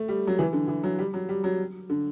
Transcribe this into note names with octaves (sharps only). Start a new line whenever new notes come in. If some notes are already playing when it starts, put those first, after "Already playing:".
Already playing: A3
G3
F#3
E3
D3
E3
F#3
G3
F#3
G3
F#3
D3